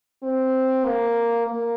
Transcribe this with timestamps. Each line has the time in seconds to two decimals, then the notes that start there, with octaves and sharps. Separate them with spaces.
0.23 C4
0.85 A#3
1.47 A#3